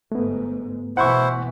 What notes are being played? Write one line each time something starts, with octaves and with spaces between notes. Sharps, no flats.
G1 G#2 A3 B3
B2 E3 E4 C5 F#5 C#6